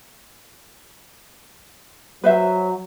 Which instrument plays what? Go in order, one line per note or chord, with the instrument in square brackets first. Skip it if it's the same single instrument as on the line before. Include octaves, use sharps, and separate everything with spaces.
[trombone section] F#3 [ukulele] B4 C5 E5